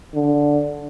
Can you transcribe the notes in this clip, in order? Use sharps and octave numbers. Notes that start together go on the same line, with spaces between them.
D3